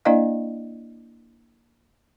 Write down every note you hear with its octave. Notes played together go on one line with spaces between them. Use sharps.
A#3 D4 E4 D5 D#5 F5